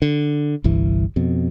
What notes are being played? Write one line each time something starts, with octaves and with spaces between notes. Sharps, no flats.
D3
G1 C2 G2 E3
F2 B2